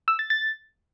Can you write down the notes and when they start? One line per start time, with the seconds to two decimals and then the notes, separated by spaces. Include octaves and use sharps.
0.08 E6
0.19 A6
0.30 A6